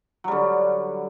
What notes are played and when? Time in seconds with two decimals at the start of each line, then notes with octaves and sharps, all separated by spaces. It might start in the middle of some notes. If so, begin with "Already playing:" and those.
0.24 F#3
0.28 G3
0.32 D3